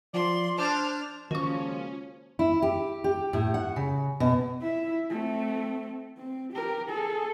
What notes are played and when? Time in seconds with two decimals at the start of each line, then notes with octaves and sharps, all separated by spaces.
0.13 F3 D5 C6
0.58 D4 C5 A5 F6
1.31 C#2 D#3 F3 A#3 C#4 F#4 C#6
2.39 E4
2.62 G4
3.04 G4
3.33 A2
3.54 F#5
3.76 C#3
4.20 B2
4.61 E4 E5
5.10 A3 C4
6.18 C4
6.53 G4 A#4
6.89 G#4 A4